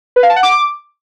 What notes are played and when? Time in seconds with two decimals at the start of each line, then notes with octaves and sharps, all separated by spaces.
0.16 B4
0.23 F5
0.30 A5
0.36 F#5
0.43 D6